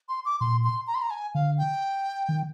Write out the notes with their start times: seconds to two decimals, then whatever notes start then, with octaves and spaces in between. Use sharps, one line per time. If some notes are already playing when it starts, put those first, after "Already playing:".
0.09 C6
0.25 D6
0.40 A#2 C6
0.64 C6
0.87 A#5
0.94 C6
1.02 A#5
1.10 G#5
1.34 D3 F5
1.58 G5
2.29 D#3